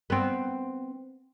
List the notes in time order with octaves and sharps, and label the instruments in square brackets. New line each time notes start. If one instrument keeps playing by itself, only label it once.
[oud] B3 C4